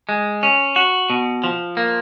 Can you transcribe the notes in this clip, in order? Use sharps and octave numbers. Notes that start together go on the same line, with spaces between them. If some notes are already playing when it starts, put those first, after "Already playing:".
G#3
C#4
F#4
B2
F3
A#3